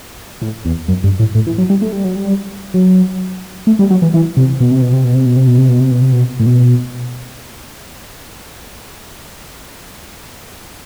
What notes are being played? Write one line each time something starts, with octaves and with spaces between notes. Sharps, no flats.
A2
E2
F#2
G2
A2
A2
E3
F#3
G3
A3
G3
F#3
G3
F#3
A3
G3
F#3
E3
E3
C3
B2
C3
B2
C3
B2
C3
B2
C3
B2
C3
B2
C3
B2
C3
B2
A2
B2